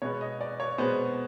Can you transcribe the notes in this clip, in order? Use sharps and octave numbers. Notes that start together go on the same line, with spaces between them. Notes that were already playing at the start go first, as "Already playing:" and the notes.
B2 G#3 B3 C#5
D#5
D5
C#5
B2 G#3 B3 C5